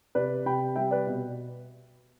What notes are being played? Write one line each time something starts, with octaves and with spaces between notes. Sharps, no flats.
C3 B4 D5
C3 G5 B5
G3 E5 G5
B4 D5
B2